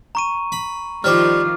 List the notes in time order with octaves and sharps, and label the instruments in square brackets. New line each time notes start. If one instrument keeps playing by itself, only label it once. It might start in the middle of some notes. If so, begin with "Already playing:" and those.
[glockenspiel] A#5 C#6 D#7
[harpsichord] B5
[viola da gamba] D#3 F3 F4 [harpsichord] G3 C5 [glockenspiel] D6 F6